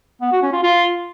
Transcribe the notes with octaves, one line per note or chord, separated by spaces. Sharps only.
B3
F#4
C#4
F4
F4